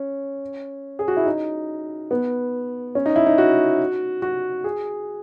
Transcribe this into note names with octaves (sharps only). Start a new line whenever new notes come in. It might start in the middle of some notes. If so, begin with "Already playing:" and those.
Already playing: C#4
G#4
F#4
E4
D#4
B3
C#4
D#4
E4
D#4
F#4
F#4
G#4